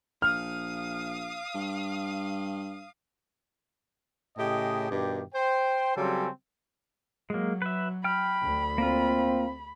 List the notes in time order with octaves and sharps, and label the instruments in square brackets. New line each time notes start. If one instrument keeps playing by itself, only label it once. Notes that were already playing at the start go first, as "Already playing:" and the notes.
[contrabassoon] A#1 [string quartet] F5 D#6 [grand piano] F6
[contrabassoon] G2
[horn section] A2 C#3 G4 G#4 D#5
G2 B2 D#3 G4
C5 G5
C#3 F#3 G3 C4 C#4 A4
[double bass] F#3 [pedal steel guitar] G#3 A#3
[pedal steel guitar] B4 E5
[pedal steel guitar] G5 F6 [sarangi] B5
[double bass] D2
[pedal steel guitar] A#3 F4 [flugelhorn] C4